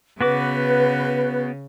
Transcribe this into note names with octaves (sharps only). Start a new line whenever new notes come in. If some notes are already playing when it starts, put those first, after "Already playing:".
C#3 B3 F#4 B4 D6